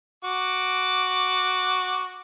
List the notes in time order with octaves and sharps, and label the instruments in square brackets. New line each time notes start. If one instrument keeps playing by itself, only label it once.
[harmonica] F#4 D6